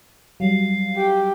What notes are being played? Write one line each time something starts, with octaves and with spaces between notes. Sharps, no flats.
F#3 G3 F5
G4